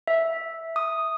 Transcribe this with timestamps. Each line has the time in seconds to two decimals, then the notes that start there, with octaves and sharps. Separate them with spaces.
0.07 E5
0.76 D#6